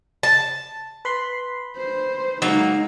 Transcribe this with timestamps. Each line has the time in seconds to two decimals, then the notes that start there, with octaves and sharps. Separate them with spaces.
0.23 A5
1.05 B4 B5 C6
1.77 C5
2.42 F#3 G#3 A#3 D#4